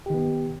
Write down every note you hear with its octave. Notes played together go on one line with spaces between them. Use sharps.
D#3 B3 G4